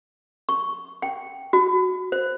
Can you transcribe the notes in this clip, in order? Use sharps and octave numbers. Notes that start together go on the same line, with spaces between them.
C#6
G5
F#4
C5